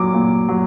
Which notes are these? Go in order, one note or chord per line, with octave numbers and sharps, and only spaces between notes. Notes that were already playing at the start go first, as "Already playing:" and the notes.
Already playing: A#2 F#3 D6
A#2
F#3